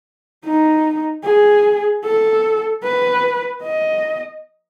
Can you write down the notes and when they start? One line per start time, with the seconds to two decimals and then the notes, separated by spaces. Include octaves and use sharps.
0.45 D#4
1.24 G#4
2.04 A4
2.84 B4
3.63 D#5